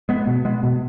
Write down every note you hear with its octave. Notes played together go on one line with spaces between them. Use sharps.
G#3 B3
B2
G#3 B3
B2